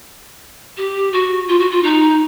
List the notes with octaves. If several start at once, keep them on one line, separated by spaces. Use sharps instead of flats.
G4
F#4
F4
F#4
F4
D#4